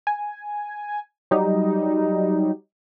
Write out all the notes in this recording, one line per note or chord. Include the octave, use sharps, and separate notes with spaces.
G#5
F#3 G3 D#4 G4